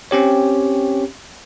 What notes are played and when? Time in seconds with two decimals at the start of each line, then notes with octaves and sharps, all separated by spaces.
0.11 C4 C#4 G4 C#5